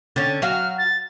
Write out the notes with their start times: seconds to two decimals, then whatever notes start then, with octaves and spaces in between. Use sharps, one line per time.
0.16 D3 C#4 A6
0.42 F#3 F#4 F5 F6
0.78 A6